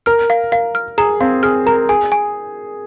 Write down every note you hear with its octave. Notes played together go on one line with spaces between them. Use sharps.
A#4 F6
F5
A#4 F5
F6
G#4 A#5
C4 F5
G#4 F6
A#4 A#5
G#4 G#5
G#5